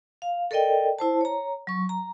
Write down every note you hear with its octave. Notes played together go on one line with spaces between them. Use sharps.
F5
A4 A#4 D5 D#5 G5
E4 C5 A5
C#5 A#5
F#3 C#6
A#5